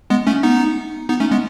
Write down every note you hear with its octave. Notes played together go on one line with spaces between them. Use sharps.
G#3 B3
A3 C#4
B3 D#4
B3 D#4
A3 C#4
G#3 B3